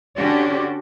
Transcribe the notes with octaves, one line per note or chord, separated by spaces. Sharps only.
D3 C#4 D4 F#4 G4